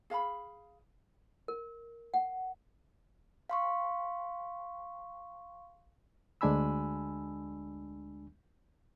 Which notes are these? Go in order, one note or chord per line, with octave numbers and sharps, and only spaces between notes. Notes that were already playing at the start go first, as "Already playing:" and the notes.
G#4 F5 A#5 B5
A#4
F#5
F5 C6 C#6
D2 G#3 D4 G#5 B5 E6